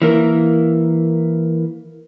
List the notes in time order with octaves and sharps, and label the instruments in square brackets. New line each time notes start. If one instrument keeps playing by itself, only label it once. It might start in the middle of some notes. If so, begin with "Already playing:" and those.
[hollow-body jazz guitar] E3 A#3 A#4